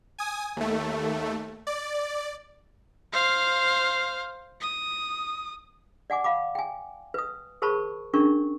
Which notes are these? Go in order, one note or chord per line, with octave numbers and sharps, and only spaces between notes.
G#5 D#6
D#2 A3
D5
C5 F5
D#6
D5 F#5 G#5 D6
F5 B5 D6
G5 G#5
B4 D#6
G#4 A#4 C5 A5 B5 C#6
C#4 D4 G#4 A#4 C#6